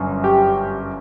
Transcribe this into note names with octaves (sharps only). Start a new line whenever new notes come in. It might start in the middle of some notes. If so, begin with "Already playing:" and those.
Already playing: G1 F#2
G4